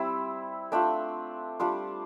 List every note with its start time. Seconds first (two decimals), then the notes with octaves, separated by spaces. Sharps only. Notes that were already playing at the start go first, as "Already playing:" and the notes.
Already playing: G3 C4 E4
0.72 A3 D4 F4 G5
1.60 G3 D4 F4 D6